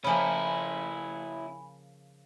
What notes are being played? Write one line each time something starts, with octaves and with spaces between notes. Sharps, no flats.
C#3 F3 A#3 C#4 E4 G#5 B5